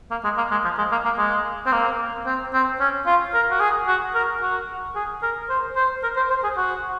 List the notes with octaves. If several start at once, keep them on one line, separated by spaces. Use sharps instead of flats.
A#3
G#3
A#3
G#3
F3
G#3
A#3
A#3
G#3
C4
A#3
C4
C4
C#4
F4
A#4
F#4
G#4
F#4
A#4
F#4
G#4
A#4
C5
C5
A#4
C5
C5
G#4
F#4